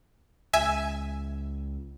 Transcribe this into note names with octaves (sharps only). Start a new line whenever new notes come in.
C#2 E5 G#5